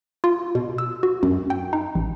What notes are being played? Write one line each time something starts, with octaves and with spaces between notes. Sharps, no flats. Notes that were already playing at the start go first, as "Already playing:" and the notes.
F4
B2
E6
F#4
F#2
G5
D#4
A1